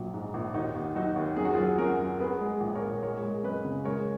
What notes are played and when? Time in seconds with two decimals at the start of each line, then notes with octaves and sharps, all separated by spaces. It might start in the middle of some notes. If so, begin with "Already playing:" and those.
Already playing: A#1 F#3
0.14 G#2
0.34 A#1
0.54 D#2 D#4 F#4
0.75 D#2
0.95 F#3 D#4 F#4
1.16 D#2
1.36 F#2 G#4
1.45 F#4
1.54 F#3 F4 G#4
1.78 F#2 F#4 A#4
2.00 F#3
2.19 B3 G#4 B4
2.41 G#3
2.61 A#1
2.75 A#4 C#5
2.82 A#2
3.02 G#3 A#4 C#5
3.23 G#3
3.43 F#2 B4 D#5
3.64 C#3
3.85 G#3 A#4 C#5